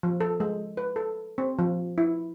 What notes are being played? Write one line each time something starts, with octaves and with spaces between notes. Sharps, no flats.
F3
A4
G#3
B4
A4
C4
F3
E4